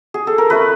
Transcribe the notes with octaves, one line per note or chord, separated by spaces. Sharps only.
G#4
A4
A#4
A3 C#4 F4 B4